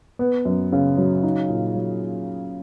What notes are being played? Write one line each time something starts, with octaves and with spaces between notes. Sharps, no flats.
B3
F#2
C#3
F#3
D#4
A#2
F#3